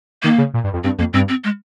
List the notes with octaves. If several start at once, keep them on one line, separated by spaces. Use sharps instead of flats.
D#3 A#3
C#3
A#2
G2
F2
G2 C4
F2 A#3
G2 C4
C4
G#3